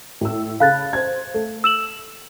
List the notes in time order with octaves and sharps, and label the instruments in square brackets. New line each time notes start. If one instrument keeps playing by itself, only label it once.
[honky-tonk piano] A2 E6
[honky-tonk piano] C#3 A4 B5 [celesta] F5 F#6 A6
[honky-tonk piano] C5 G#6
A3
[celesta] E6 E7 F#7